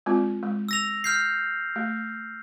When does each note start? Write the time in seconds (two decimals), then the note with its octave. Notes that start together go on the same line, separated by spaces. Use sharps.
0.06 G#3 C4 F4
0.43 G#3
0.69 E6 A#6 F7
1.04 F6 G6 C7
1.76 A3